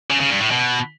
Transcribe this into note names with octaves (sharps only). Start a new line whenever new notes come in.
C#3
C#3
G2
A2
B2